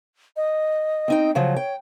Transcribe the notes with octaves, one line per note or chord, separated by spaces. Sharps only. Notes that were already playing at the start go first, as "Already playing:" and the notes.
D#5
C4 D#4 G5
C#3 F3 F#3 C#5
G5